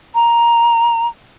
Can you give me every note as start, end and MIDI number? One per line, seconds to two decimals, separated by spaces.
0.15 1.07 82